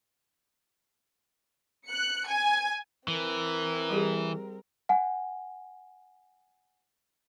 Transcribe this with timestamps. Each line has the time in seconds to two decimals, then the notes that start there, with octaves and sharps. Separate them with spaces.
1.86 F#6 C#7
2.27 G#5
3.08 E3 C4 A#4
3.90 G3 G4 G#4
4.89 F#5 G#5